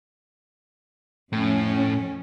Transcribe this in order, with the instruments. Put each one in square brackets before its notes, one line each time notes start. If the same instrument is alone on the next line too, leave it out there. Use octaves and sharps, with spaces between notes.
[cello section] F2 C#4 [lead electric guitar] A2